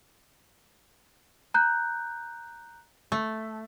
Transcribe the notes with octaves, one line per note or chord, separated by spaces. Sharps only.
A#5 F#6 G6
A3